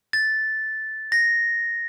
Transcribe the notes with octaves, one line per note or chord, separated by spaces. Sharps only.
A6
A#6